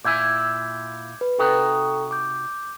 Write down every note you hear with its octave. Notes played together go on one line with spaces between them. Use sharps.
A#2 E4 G#5 D6 G6 G#6
B4
C3 D#4 F#4 A4 G5 A#5
D6 G6